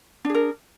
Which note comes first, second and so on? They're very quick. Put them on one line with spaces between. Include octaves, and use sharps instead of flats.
D4 G#4 A#4